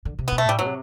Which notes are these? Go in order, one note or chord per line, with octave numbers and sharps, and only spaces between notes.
D3
C3
B2 B3
A3
A2 G3
B2 F#3
C3